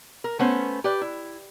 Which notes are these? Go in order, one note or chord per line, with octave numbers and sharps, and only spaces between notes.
A#4
A3 B3 C#4 C5
G4 B4 D5
E4